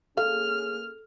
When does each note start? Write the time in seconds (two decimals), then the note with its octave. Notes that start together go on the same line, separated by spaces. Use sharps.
0.17 A#3 C#4 G#4 A4 F5 F6